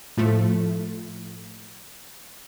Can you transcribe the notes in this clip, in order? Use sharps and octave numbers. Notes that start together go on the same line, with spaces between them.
A2 F3 A3